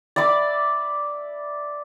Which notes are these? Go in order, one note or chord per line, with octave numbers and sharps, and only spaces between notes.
D5 E5 B5 D6